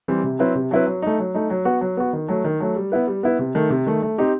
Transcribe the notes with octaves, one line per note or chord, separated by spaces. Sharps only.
E3 G3 C4
C3
F#3 C4 E4 B4
C3
F#3 C4 E4 B4
F#3
A3 D#4
F#3
A3 D#4
F#3
B3 F#4
F#3
B3 F#4
D#3
F#3 A3
D#3
F#3 A3
G3
B3 E4 B4
G3
B3 E4 B4
C3
D#3 A3
C3
D#3 A3
A3
C4 D#4 G4